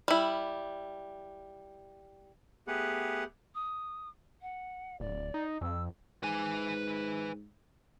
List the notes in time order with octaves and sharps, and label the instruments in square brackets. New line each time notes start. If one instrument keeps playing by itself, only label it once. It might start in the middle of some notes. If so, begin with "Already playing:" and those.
[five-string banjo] G3 E4
[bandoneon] A3 B3 G4 G#4 B4 F#5
[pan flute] D#6
F#5
[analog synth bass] D1 [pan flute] D5
[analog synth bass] D#4
[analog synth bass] F2 [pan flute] E6
[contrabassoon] G#2 [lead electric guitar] B4 G#5